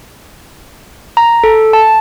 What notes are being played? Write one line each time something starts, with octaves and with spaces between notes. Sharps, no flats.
A#5
A4
A5